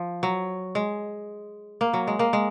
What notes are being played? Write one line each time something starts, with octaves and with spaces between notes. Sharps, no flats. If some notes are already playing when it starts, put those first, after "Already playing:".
Already playing: F3
F#3
G#3
A#3
F#3
G#3
A#3
G#3